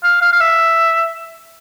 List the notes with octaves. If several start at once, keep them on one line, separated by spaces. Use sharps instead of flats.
F5
F5
F5
E5